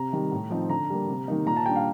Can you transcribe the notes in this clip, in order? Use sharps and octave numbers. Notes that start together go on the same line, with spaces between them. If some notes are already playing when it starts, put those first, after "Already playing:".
Already playing: C3 A#5
D#3 G3
A2
F3 C4 D#4
D3 A#5
G3 A#3
C3
D#3 A#3 D#4
A#2 A#5
A5
G3 D4 G5
F5